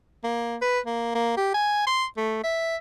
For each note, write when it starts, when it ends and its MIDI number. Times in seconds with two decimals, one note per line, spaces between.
0.24 0.57 58
0.62 0.80 71
0.86 1.12 58
1.15 1.35 58
1.37 1.51 67
1.54 1.87 80
1.87 2.05 84
2.17 2.39 57
2.43 2.77 76